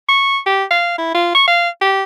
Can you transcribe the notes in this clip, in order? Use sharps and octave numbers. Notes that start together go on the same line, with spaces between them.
C#6
G4
F5
E4
F4
C#6
F5
G4